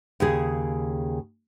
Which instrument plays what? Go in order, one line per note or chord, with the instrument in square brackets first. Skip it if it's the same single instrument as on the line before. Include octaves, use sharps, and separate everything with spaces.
[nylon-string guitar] D#2 C#3 G#4